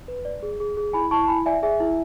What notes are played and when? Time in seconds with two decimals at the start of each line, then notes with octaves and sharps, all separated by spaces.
0.08 B4
0.25 D5
0.43 G#4
0.60 G#4
0.77 G#4
0.93 E4 G#5 B5
1.11 E4 A5 C#6
1.23 A5
1.28 E4 G#5 B5
1.46 D5 E5 G#5
1.63 G#4 E5 G#5
1.80 E4